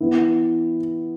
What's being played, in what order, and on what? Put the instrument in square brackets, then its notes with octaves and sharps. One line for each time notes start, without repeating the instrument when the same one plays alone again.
[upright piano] E3 B3 E4